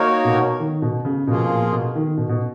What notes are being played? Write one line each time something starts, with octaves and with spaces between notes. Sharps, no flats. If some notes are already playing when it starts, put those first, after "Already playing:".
Already playing: A#3 D#4 F#4 A#4 C#5
B2
D#3
B2
C#3
B2 F3 A#3 F4 G#4
A#2
B2
D#3
B2
B2